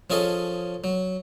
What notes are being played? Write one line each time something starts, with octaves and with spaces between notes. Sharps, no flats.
F3 C#4 G#4 A4 D#5
F#3